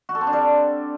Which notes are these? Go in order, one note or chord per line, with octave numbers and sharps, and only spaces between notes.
F#4
A4
C4
D4
G3